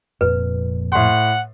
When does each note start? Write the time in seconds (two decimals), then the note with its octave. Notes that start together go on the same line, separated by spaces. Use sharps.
0.21 F1 F2 A#2 B4
0.92 A2 F#5 C6